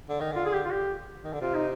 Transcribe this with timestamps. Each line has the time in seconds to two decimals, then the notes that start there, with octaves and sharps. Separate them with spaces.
0.09 D3
0.20 D#3
0.32 D3 F4
0.45 G#4
0.53 G4
0.65 F4
0.71 G4
1.24 D#3
1.33 D3
1.41 C3 F4
1.54 D#4